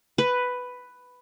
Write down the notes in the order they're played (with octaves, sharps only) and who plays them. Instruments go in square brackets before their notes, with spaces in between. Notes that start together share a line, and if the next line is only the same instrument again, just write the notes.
[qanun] B4